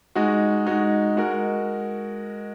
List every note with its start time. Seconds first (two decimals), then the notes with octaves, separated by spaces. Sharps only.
0.15 G#3 D#4 F#4
0.66 G#3 D#4 F#4
1.17 G#3 F#4 A#4